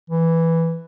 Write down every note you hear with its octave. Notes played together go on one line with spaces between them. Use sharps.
E3